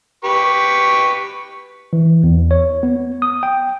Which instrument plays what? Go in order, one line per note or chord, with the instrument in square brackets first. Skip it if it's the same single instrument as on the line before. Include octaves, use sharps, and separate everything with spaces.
[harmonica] G4 B4 C#6
[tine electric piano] E3
E2
C#5
B3
D#6
G5